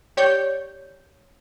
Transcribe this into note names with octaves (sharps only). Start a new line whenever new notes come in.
G4 C#5 D5 G6